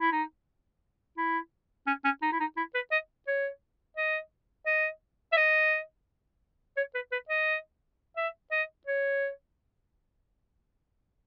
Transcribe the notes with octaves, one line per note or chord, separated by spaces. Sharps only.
E4
D#4
E4
C#4
C#4
D#4
E4
D#4
E4
B4
D#5
C#5
D#5
D#5
E5
D#5
C#5
B4
B4
D#5
E5
D#5
C#5